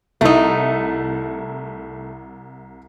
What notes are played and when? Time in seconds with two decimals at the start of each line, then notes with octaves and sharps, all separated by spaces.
0.21 C2 A3 D#4 E4